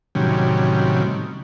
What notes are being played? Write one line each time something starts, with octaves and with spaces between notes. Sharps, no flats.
A2 C3 D#3 F#3 G3 C#4